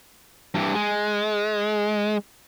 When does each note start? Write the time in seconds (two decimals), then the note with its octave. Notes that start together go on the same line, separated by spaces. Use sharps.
0.54 G2 E3
0.75 G#3